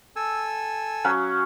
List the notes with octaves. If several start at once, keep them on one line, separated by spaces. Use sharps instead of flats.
A4 G#5 E6
F#3 C#4 F#4